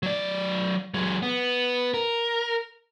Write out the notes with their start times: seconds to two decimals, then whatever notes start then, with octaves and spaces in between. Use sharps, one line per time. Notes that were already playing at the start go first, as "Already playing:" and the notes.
0.03 F#3 D5
0.94 F#3 G#3
1.23 B3
1.94 A#4